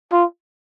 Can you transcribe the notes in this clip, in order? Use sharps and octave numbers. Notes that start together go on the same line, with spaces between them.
F4